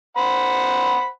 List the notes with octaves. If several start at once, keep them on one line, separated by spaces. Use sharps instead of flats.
C5 F#5 B5